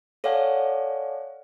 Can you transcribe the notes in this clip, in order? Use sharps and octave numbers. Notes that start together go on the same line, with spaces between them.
A4 C#5 D5 F5 F#5 G#5